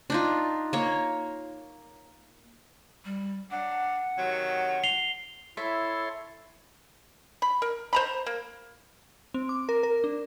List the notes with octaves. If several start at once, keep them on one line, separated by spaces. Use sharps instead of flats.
D4 D#4 F4
A#3 C#5
G3
F#3 D4 F#5
C3 D#3 F#3
C7 F7 G7
E4 A4 C#5 E5 C6
B5
A#4
C5 A#5 B5
A#3
C4
D6
A#4
A#4
D4